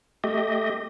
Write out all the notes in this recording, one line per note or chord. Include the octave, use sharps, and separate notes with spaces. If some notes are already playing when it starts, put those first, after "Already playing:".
A3 G4 D#5